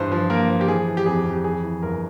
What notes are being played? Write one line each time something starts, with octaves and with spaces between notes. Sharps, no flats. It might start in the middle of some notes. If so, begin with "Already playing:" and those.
Already playing: G2 E3 C5
F3
A#3 A#4
F3
G4
E3 G#4
E3
G4
F2 G#4
F2
G4
E3 G#4
E3
G1 A#4